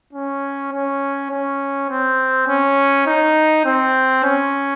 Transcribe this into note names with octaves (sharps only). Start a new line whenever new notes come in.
C#4
C#4
C#4
C4
C#4
D#4
C4
C#4